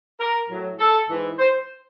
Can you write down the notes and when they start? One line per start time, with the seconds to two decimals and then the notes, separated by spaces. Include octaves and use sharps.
0.19 A#4
0.49 A2 F#3
0.78 A4
1.09 G#2 E3
1.38 C5